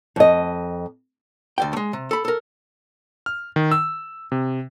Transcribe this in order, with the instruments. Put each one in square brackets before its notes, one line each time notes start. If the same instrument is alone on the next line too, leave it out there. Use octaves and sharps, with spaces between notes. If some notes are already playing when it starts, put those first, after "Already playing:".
[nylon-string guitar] F2 D#5
[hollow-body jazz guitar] D2 D5 G5
G#3 A3
C3
A4 B5
A4 A#4
[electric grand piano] F6
D#3
E6
C3